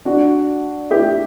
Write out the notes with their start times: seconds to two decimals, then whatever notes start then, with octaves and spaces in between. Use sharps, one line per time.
0.05 D4 F#4
0.91 E4 G4